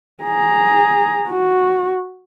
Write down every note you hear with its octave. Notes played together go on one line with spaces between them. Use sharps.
G#4 A#5
F#4